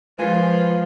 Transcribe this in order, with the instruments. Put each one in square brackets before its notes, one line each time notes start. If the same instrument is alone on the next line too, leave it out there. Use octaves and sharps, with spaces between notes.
[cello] F3 [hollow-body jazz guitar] G#3 A#4 G#5 [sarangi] F4 [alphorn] B4